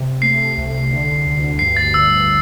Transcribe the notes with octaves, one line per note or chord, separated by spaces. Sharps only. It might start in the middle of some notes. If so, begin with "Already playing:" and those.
Already playing: C3
A3 C7
C2
D3
D2
G2 C7
A6
G1 E6